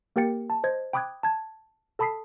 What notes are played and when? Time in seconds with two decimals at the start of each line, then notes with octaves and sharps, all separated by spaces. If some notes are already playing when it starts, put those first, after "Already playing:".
0.16 A#3 G4 A#4 G5 A6 C#7
0.50 A5
0.64 C5 D#5 G#6
0.93 G5 B5 D6 D#6 F#6 G#6
1.23 A5 G#6
1.99 A4 A5 B5 D#6 B6 C7